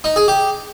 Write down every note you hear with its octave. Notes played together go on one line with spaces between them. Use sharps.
D#4
G#4
G4